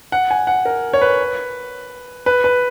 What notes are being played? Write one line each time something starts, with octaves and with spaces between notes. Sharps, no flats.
F#5
G#5
F#5
A#4
C#5
B4
B4
B4